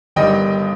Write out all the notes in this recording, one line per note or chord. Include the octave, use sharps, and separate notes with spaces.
G1 G2 D#3 G3 D#5 G5